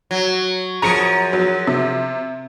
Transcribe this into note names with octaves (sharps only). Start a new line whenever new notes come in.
F#3
F#2 F3 G#4 A#5 C#7 D7
F#3
C3